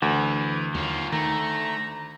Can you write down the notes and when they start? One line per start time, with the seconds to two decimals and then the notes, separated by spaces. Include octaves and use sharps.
0.02 D2 E3
0.75 D#2 F#3 F4
1.12 D#3 A3 A#5